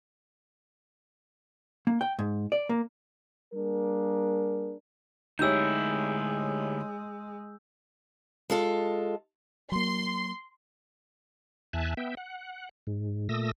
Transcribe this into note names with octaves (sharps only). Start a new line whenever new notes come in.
A#3
G5
G#2
D5
A#3
G3 A#3 D4 G#4 A#4
D2 G#3 D#4 E4 G4 C#5 E6 G6
G#3 F4 A4
F#3 A#3 C6
E2 E5 G#5 A5 F#6
B3 E5 G5
F#5
G#2
A#2 A3 D#6 E6 A#6